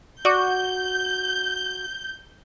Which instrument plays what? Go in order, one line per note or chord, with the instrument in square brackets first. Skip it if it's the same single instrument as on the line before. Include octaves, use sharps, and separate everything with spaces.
[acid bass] F#4 [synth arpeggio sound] D5 C#6 D6 [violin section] G6